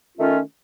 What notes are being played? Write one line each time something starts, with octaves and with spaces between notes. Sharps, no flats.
D#3 A3 C#4 F4